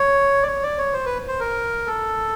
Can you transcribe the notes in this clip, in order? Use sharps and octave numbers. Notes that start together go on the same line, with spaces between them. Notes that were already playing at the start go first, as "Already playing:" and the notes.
Already playing: C#5
D5
C#5
D5
C#5
C5
B4
C5
A#4
A4